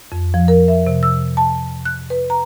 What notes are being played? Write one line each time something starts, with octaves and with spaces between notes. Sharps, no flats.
F2
F3
A#4
E5
C3
E6
A5
F#6
B4
A#5